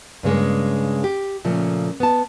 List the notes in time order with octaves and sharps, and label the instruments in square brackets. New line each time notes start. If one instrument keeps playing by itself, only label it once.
[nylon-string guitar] G2 C#3 G#3 A#3
G4
A#2 C#3 F3 A3
B3 A5